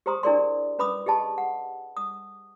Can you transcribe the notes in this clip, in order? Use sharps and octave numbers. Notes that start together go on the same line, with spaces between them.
G4 G#4 C5 A#5 C6 D#6
D4 E4 G#4 A#4 D5 C6
C#4 B4 B5 D6 D#6
G4 G#4 D#5 A5 B5
F#5
D#6